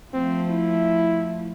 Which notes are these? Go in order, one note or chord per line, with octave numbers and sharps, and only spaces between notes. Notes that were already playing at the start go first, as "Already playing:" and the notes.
F3 A3 C4
E4